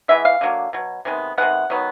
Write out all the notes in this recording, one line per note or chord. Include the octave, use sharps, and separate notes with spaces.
E3 G#3 B3 E5
F5
D3 F#3 A#3
B2 F#3
C3 D#3 G#3 B3
C3 D#3 G#3 B3 F#5
D#3 F#3 B3